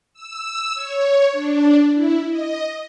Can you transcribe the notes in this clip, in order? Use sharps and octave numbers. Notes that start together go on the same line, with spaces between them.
E6
C#5
D4
E4
D#5